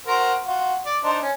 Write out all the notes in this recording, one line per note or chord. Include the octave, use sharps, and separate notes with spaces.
F#4 A#4 C5
F4 F#4
D5
D4 D#4 C5
C#4